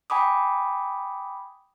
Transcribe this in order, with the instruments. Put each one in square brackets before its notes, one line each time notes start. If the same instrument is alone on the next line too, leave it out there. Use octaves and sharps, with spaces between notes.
[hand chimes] G5 G#5 B5 D6 D#6